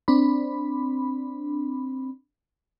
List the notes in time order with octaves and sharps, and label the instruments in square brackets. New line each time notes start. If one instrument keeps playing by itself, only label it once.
[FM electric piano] C4 D4 B5